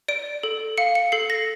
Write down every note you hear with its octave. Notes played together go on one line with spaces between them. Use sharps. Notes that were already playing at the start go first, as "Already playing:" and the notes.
D5 D7
A4
F5 C#7
C#7
A4 C7
A#6